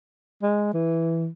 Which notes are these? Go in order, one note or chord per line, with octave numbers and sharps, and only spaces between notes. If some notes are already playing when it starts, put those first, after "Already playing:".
G#3
E3